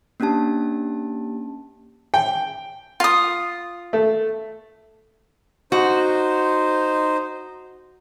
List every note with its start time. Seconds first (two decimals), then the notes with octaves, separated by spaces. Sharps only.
0.20 A#3 C#4 D4 G4 A5
2.14 G5
3.00 F4 D#6
3.93 A3
5.72 D#4 F#4 C5